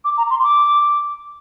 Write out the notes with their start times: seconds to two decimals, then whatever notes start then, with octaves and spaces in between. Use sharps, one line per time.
0.05 D6
0.18 A#5
0.30 C6
0.43 D6